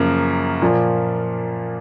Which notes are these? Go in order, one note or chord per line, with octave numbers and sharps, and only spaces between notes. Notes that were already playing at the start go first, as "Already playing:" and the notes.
Already playing: F#2 C#3 F3 A#3
A#2 F3 A#3